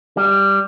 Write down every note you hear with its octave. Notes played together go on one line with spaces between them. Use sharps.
G3